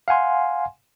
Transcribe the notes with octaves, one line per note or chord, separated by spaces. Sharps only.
F5 F#5 G#5 C6